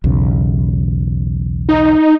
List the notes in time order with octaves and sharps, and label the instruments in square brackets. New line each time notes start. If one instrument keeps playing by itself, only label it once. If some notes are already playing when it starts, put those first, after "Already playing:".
[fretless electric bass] B1 E2 C#3
[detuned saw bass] D#4